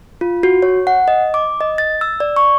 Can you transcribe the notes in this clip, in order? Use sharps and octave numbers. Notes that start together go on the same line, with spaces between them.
F4
F#4
C#5
F#5
D#5
D6
D#5
A6
E6
D5
C#6